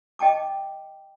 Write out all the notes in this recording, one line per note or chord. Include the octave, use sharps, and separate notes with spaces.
D#5 G5 A5 D6